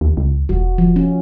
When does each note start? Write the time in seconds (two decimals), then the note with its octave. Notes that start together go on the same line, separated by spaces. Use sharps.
0.01 D#2
0.17 C#2
0.49 E1 F#4
0.78 F3
0.96 C#4